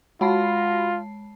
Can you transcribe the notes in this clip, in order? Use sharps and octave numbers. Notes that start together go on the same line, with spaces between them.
G#3 F4 F#4 A5 B5 A#6 C7